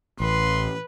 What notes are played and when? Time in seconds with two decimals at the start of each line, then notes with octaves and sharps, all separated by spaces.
0.20 A1 B4 C6